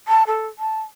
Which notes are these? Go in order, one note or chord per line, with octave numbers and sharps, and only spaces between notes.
A5
A4
A5